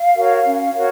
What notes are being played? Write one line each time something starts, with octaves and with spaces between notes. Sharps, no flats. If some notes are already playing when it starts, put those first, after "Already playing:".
Already playing: F5
F#4 A#4 C#5
C#4
F#4 A#4 C#5